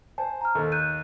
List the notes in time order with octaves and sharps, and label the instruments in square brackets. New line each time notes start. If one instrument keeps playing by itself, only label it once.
[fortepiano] C5 [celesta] G#5 A5
[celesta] A#5 F6
[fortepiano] D#2 [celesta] A4
[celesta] F#6 G6 D#7